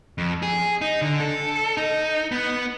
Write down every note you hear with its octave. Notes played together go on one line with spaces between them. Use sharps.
F2
G#4
D#4
D3
A4
D#4
B3